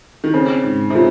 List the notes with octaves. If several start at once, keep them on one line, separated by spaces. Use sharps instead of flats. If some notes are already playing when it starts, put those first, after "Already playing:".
D#3
C#3 C4
G#2
C3
C#3 F4